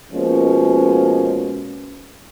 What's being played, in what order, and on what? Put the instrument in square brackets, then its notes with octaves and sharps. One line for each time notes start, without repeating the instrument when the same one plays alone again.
[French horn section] B2 F3 G#3 A#3 C#4